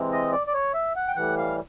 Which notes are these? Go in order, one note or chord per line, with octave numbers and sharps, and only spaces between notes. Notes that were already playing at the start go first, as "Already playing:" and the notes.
Already playing: C3 E3 G#3 C4
D#5
D5
D5
C#5
E5
F#5
G5
A2 E3 G3 F#5
F5